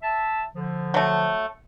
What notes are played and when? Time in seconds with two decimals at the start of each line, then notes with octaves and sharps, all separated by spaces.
0.03 E5 A5
0.54 D3 F3
0.94 F#3 A3